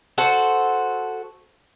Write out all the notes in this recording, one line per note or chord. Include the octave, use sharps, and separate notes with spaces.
F#4 A4 C5